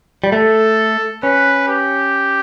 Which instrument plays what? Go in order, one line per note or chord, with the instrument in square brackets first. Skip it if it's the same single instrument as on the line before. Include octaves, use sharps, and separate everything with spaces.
[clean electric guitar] G3
[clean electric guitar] A3 [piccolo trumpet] A4
[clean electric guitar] C#4 [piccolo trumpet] B4
[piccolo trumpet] G4